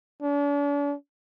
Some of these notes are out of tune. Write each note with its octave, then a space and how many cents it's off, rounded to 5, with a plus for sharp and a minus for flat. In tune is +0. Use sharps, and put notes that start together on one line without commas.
D4 -45